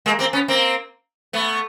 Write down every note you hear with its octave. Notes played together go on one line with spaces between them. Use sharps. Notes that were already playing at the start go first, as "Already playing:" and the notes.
G#3 A#3
A#3 C4
B3 C#4
A#3 C4
A3 B3